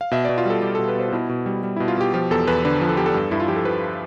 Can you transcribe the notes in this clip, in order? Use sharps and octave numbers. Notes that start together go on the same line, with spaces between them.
F5
B2 E5
B2 D5
F4
G3 A4
G3 G4
B2 A4
B4
B2 C5
F4
B2 E4
B2
G3
G3
B2 E4
F4
B2 G4
F3 G4
E2 A4
E2 B4
D3 B4
F3
A4
E2 G4
A4
G2
G2 E4
F4
F3 G4
A4
F3 B4